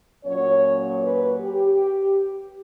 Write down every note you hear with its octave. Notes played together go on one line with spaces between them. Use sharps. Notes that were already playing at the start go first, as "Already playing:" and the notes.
A#2 F#3 C#4 C#5
B4
G4